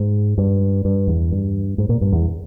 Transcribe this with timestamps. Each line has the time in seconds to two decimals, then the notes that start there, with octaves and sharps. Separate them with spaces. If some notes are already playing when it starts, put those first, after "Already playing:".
Already playing: G#2
0.38 G2
0.85 G2
1.07 E2
1.31 G2
1.78 G#2
1.89 A#2
2.01 G2
2.12 E2